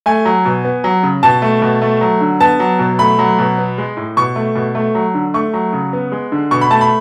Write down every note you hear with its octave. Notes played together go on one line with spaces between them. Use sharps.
A3 G#5
F#3
B2
B3
F#3
C#3
B2 A5
A3
B2
A3
F#3
D3
B3 A5
F#3
B2
A3 B5
F#3
B2
B3
G#3
A2
B2 C#6
A3
B2
A3
F#3
D3
A3 C#6
F#3
C#3
B3
G#3
D3
B2 C#6
B5
A3 A5
B5